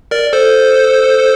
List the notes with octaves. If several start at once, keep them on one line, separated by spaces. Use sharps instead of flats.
A#4 D5
A4 C5